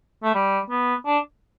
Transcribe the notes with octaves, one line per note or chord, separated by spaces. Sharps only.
A3
G3
B3
D4